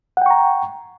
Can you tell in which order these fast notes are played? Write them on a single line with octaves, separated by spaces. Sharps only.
F#5 G5 C#6 A#5